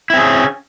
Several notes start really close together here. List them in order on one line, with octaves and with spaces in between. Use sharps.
E4 C4 G#4 C#4